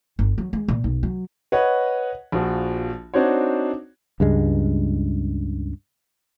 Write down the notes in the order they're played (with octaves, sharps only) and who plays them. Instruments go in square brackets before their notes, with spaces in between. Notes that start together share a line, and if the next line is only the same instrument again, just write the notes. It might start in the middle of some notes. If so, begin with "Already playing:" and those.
[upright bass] G1
F#3
G#3
A#2
B1
F#3
[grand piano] B4 C#5 D#5 F#5
A#1 F3 F#4
C4 D4 D#4 F#4 C5 C#5
[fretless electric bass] C#2 G2 G#3